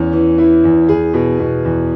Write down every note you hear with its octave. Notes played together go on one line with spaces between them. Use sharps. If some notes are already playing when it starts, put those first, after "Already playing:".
Already playing: E2 C#4
E3
E3 E4
E2
E2 G#4
B2
B2
E2